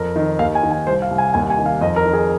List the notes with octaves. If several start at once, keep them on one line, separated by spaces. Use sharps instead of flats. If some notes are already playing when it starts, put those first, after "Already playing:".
Already playing: F2 A#4
D#3
D#2 F5
G#5
D#3
G#5
C2 C5
F5
C2
G#5
D#2 G#5
G#5
D#3
F5
F2 D#5
A#4
D#3
G#4